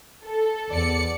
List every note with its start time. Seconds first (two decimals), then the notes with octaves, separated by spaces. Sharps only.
0.24 A4
0.71 E2 D5 C#7